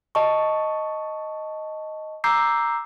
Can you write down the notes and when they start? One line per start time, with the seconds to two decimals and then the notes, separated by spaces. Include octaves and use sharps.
0.15 D#5 A5 C#6
2.24 A#5 D6 E6 G6 C7